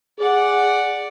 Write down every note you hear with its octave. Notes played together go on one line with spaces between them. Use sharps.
G#4 D5 F#5